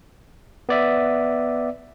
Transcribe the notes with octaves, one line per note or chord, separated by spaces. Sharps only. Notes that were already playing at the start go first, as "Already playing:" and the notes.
B3 D5 E5